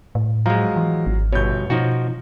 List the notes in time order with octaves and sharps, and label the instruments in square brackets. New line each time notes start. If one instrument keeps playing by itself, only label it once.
[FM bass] A2
[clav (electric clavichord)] F3 G#3 [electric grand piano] F#3 F5 A#5
[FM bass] E3
G#1
[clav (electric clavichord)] G1 B2 [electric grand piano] C#5 G6
[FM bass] B2 [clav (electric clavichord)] F3 D#4 F#4